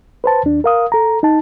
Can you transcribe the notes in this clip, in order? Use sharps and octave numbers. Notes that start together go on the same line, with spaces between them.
B4 C5 A5
D#2 D4
A#4 F5 D#6
A4 A#5
D#4 A5